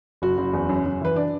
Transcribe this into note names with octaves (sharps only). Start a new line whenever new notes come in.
F#1 F#4
F#1
E2
F#2
F#2
E3 B4
D4 D5